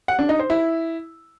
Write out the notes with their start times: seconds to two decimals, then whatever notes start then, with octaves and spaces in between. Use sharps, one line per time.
0.08 F#5
0.19 D4
0.29 D#4
0.39 C5
0.50 E4